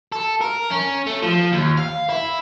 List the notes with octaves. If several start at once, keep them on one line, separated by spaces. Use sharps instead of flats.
A4
A#4
C#4
A3
F3
D#2
F5
E4